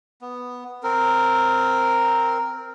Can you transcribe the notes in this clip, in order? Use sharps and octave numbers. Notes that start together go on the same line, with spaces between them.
B3
C4 A#4